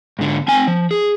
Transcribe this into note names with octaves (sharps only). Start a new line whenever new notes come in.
G#2 D3
C4 G#5
F3
G#4